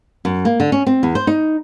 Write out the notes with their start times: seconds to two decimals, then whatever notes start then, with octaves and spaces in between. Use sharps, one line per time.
0.25 F#2
0.45 A#3
0.60 D3
0.72 C#4
0.87 C4
1.03 E2
1.15 C5
1.27 D#4